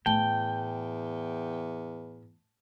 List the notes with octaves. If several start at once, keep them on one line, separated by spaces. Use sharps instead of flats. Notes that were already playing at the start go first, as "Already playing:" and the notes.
E2 A2 G5 A5 G7